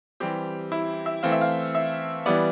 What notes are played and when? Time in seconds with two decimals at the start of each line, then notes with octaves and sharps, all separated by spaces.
0.20 E3 G3 C4 G4
0.72 E4
1.06 E5
1.23 E3 A3 C4 F5
1.32 E5
1.41 F5
1.75 E5
2.26 E3 G3 B3 D5